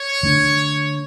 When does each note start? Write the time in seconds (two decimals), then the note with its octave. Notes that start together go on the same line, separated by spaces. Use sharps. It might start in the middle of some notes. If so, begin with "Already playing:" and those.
Already playing: C#5
0.23 D3 A3 D4